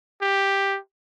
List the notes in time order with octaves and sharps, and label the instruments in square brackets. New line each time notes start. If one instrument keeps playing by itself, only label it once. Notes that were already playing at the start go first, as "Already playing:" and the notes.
[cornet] G4